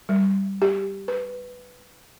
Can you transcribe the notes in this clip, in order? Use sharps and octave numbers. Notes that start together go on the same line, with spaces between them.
G3
G4
B4